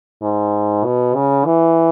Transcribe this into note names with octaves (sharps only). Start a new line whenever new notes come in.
G#2
B2
C#3
E3